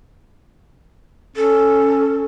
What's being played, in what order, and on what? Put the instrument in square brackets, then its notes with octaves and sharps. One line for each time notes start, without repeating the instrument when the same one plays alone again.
[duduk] C#4 [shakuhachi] A4